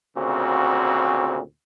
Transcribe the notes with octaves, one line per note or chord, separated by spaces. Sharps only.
D2 A#2 C#3 C4 F#4